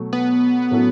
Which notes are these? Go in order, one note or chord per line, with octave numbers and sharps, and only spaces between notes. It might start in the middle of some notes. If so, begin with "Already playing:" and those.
Already playing: B2 F#3 A3
B3
A2 F#3 C#4 F#4 A4